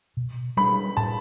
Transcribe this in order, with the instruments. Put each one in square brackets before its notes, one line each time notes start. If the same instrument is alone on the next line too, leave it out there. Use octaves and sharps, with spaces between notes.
[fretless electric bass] B2
[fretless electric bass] G3 D4 [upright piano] B5
[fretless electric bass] A2 [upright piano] A5